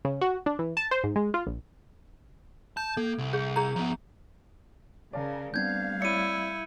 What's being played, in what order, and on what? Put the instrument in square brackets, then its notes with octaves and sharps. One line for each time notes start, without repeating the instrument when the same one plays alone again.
[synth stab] C#3
F#4
D4
E3
A5
C5
G#2
G#3
F4
A#1
[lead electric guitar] A5 [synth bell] G6
[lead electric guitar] A#3 [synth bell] A4
[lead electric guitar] C2
[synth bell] G#4
G#4 A#5
[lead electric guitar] F3 B3
[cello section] C#3 A#4 [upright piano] D5 F5 A5
[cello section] G3 A3 F5 [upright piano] B3 C4 D4 [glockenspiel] G6 G#6
[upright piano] C4 C#5 D5 [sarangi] E4 [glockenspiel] C#7 D#7